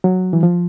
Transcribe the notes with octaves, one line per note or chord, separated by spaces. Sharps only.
F#3
E3
F3